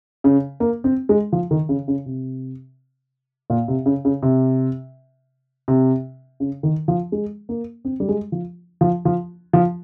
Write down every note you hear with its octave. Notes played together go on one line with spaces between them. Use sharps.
C#3
A#3
C4
G#3
F3
D#3
C#3
C#3
C3
A#2
C3
C#3
C#3
C3
C3
C#3
D#3
F3
G#3
A#3
C4
G3
G#3
F3
F3
F3
F3